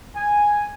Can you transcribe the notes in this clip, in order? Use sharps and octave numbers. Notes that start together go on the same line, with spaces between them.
G#5